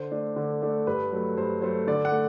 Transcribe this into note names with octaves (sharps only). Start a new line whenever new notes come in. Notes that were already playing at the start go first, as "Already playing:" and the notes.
Already playing: D3 C5
A3 D4
D3
A3 D4
G2 B4
F#3 A3
G2 C5
F#3 A3 C5
D3 D5
F#5
A3